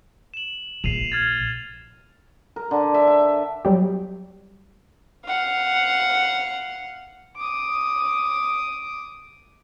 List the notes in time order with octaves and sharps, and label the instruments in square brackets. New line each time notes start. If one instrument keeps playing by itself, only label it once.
[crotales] E7 F#7
[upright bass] A#1 [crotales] C7 D#7 F7
[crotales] F6 G#6 A6
[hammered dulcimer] A#4
D3
E5
E5
[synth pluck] F#3 G3 G4
[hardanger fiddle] F5 F#5
D6 D#6